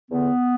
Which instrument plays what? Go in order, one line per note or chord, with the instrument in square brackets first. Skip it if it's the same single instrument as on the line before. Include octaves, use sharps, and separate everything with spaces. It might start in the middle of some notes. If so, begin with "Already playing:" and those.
[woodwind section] E2 D3 B3